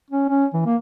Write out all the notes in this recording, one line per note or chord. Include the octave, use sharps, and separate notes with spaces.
C#4
C#4
E3
A#3